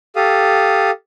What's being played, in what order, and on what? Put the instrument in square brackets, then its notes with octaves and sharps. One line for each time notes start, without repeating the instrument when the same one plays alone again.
[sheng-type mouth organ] G4 A4 F5 D#6